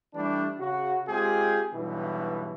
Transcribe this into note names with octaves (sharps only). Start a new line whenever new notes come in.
E3 G3 A3 D4
C#3 F#4
G#3 C4 F4 G4 G#4
B1 G2 B2 E3